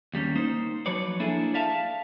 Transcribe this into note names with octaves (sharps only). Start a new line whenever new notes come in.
D#2 G3 A#3 C#4
A#3 D#4 C5
F3 F#3 B4 C#5 D5
A#3 D4 E4 G#4 A4
D5 E5 F5 A5